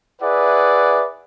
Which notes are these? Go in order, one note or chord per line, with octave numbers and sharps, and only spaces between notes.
E4 G#4 B4 D5 E5 F#5